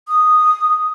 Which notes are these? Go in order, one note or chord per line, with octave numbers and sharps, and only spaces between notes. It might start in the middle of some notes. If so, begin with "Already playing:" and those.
D#6